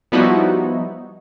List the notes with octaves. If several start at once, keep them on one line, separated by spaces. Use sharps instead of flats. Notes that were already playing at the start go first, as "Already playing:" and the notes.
F3 G3 B3 D#4 E4 F#4